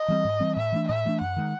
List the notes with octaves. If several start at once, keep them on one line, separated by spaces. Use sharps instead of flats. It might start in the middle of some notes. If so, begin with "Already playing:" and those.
Already playing: D#5
E3 G3 C4
G#2
E3 G3 C4
A2 E5
E3 A3 D4
A2 E5
E3 A3 D4
F#2 F#5
D#3 G#3